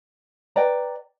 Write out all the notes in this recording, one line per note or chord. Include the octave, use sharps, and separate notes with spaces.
B4 D5 G5 A#5